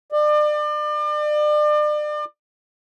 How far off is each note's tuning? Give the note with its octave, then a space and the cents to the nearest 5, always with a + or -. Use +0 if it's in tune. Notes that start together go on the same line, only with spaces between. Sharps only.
D5 +35